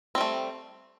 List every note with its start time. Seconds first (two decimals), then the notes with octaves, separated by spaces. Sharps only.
0.15 C4
0.18 G3
0.21 A3